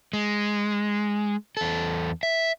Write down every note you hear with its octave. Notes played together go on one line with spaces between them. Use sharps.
G#3
E2 A4
E5